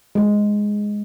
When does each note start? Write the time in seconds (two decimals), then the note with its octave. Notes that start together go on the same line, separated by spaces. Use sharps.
0.15 G#3